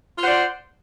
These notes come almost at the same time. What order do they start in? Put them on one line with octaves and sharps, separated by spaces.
F4 F#5 C5 D5